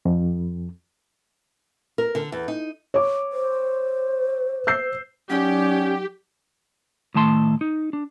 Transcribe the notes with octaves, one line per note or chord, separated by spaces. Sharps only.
F2
A#4
D3
E2
D#4
C#5 D6
C5
E6 G6 C7
F#3 C#4 D#4 G4 D5
A2 D#3 A3 A5 C6
D#4
D4